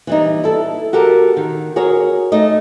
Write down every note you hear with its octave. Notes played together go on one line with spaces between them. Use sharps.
E3 G3 D#4
E4 A4
F#4 G4 A4 A#4
D#3
F#4 G#4 A#4 C#5
A3 D#4 D#5